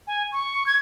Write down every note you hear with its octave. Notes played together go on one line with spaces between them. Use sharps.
G#5
C#6
G#6